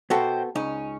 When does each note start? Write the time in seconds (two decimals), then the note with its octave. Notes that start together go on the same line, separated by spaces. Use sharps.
0.10 B2 B3 F#4 A4 C5 G5
0.56 C#2 C#4 D#4